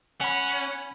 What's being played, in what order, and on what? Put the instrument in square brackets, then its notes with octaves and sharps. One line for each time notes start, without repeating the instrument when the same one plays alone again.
[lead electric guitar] C#4 [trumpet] F#5 [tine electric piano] G#5 B5